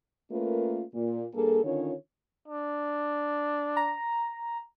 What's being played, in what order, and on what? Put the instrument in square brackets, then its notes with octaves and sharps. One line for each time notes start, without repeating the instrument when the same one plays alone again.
[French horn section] A3 A#3 C#4 F4 A#4 B4
A#2
G2 A#3 G#4 A4
D3 D#3 C#4 F4 C#5
[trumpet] D4
[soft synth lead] A#5